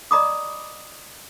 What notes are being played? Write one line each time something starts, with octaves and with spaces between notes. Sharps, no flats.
D5 D#5 A#5 B5 D6 D#6